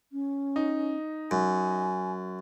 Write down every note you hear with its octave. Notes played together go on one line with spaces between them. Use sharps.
C#4
D#4
F#2 G#5